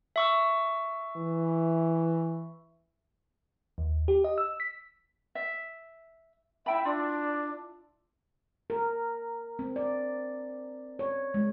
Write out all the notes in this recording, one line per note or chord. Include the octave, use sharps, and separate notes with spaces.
E5 C#6 E6
E3
D#2
G4
D#5
E6
B6
E5
E4 E5 G5 B5
D4 E4 F4
A#4
C4
D5
C#5
G#3